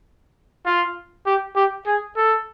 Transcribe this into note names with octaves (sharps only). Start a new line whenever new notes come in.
F4
G4
G4
G#4
A4